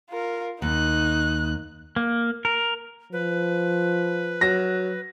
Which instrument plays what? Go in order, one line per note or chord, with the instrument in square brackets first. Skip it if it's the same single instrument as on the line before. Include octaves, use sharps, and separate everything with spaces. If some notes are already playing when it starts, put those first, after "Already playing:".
[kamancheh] F4 A#4
[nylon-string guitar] D#2 [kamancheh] D#4 F#6
[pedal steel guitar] A#3
A#4
[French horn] F3 [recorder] B4
[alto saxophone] F#3 [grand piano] A#6